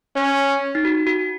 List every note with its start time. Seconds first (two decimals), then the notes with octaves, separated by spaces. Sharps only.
0.15 C#4 C#5
0.75 D#4
0.85 F#4
1.07 F#4